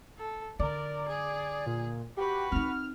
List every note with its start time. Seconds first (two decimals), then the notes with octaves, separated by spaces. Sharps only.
0.18 A4
0.59 D3 A#4 D5
1.08 G#4
1.66 A#2
2.17 F#4 G4 B4
2.52 C4 D#4 F6